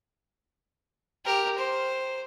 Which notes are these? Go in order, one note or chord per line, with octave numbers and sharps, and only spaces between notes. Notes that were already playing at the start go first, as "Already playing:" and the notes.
G4 A#4
C5